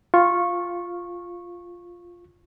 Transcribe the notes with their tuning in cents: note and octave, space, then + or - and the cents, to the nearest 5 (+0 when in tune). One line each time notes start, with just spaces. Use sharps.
F4 +0 C#6 -15